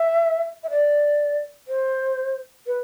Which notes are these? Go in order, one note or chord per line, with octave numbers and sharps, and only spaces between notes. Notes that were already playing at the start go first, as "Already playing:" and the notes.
Already playing: E5
E5
D5
C5
B4